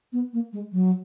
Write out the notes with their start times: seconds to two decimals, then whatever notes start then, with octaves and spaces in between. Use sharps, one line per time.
0.13 B3
0.33 A#3
0.53 G#3
0.73 F#3